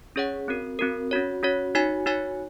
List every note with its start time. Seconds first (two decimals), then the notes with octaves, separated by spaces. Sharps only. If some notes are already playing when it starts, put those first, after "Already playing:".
0.16 C#4 G#4 C#5 F#5
0.48 C4 F#4 A#4
0.79 C4 F#4 A#4
1.11 C#4 F#4 C#5
1.43 C#4 F#4 C#5
1.75 D#4 F#4 C#5 G#5
2.06 D#4 F#4 C#5 G#5